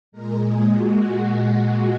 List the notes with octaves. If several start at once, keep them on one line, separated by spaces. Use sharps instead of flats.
A#2 G#3 A#4
G#4
F#4